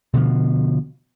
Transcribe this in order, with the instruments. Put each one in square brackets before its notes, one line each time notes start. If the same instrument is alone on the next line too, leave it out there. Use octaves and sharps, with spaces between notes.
[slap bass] B2 D3 F3